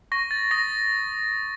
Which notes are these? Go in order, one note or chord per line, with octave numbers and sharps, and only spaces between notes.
C#6 A#6
A6
D#6 A#6